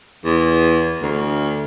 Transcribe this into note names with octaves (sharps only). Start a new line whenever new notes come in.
E2
D2